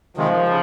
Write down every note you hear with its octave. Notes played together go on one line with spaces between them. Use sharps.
C3 D#3 F3 G#3
C#3